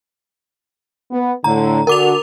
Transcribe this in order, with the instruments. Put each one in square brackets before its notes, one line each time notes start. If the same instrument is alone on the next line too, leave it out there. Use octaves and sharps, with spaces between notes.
[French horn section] B3
[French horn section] A2 D3 [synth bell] A#5
[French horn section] D3 F#4 [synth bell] A#4 D6 F7